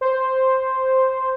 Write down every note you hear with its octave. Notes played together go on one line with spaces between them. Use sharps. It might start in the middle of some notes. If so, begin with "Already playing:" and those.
C5